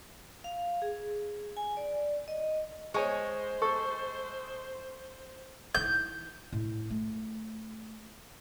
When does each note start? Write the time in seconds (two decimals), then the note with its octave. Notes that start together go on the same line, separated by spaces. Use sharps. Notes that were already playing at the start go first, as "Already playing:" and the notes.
0.44 F5
0.82 G#4
1.57 G#5
1.77 D5
2.28 D#5
2.94 G#3 C5 C#5 G#5 C#6
3.62 A4 C#6
5.75 E3 D#4 G6
6.52 A2
6.90 A3